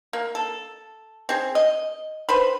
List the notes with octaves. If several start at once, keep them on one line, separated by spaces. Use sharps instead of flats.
A#3
A4
C4 G#4
D#5
B4 C5 B5